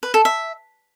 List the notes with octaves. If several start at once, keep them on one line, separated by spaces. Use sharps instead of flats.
B4
A4
E5